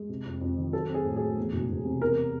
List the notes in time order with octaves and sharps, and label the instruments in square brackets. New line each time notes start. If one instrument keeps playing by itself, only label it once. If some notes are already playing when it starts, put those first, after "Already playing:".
Already playing: [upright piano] G#3
C3
F2
F2
D#3
F#3 A4
C4
G#4
A2
A3 G#4
E2
E1
E1
C3
E2 A#4